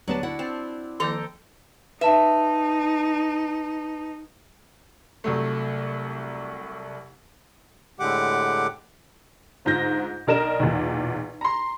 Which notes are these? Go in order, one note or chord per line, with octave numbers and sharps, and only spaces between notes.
D2 F#3 B3 D4 G4 B4 A5
E4 F#4 F#5
C4 A5
D#3 F3 A#3 A4 G5 A#5
D#4 B4 E5 A5
C2 F#3 A3
A2 D3 G#3 G4 F#5 D6
D2 G#2 F4 G6 A#6
B1 D4 A#4 D#5 E7
B1 E2 A#2
A#5 C6